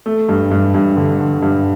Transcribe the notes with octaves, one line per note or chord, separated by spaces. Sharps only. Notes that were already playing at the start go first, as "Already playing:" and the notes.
A3
G2
G2
G2
D3
D3
G2